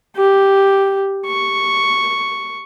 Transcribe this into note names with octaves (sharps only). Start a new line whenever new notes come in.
G4
C#6